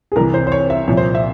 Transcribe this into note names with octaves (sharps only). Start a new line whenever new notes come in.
G#4
C2 C3 E3 A#4
C5
C5
C#5
E5
C2 A#2 F3 C#5
C5
E5